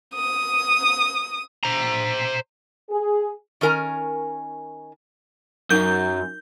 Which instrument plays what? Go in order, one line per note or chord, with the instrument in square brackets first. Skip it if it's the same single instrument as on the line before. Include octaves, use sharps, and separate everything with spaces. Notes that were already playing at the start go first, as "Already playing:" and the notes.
[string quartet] D#6
[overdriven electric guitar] C5 A#5
[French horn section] G#4
[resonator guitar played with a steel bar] D#3 C#4 A#4 G#5 A#5
[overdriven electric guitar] F#2 [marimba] D#4 A#4 [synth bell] G6